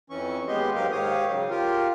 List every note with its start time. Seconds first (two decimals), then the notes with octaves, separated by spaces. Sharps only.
0.10 F2 E3 C#4 C#6
0.48 D#2 G#3 B3 G4 D#5 C6
0.75 G#2 F#3 G4 A#4 F5
0.92 G#2 D#3 G4 C#5 F5 D#6
1.29 C#3 F#3
1.50 F4 G4 A#4